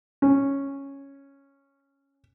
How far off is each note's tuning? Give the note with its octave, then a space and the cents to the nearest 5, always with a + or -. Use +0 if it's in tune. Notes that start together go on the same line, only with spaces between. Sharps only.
C#4 -5